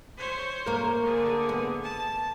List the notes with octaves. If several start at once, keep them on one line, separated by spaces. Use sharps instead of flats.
C5 C#5
A#3 A#4
D3 G#4
B3
A5